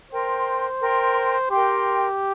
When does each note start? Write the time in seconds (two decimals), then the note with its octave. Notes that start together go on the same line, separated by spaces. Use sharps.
0.11 A#4 C5 G5 C6
0.80 A#4 G5 C6
1.50 G4 A#4 G5 C6